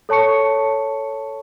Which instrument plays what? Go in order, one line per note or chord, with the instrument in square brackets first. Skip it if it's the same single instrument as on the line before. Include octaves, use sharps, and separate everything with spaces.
[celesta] A4 C#5 A5 C#6 C#7